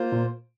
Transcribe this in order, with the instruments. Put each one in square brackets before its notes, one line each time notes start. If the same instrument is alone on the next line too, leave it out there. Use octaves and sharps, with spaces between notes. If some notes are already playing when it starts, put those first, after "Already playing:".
Already playing: [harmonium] A#3 F4 C5
[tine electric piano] A#2